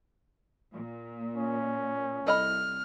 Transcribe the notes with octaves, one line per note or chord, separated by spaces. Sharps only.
A#2
C#4
C2 A4 D#5 B5 F6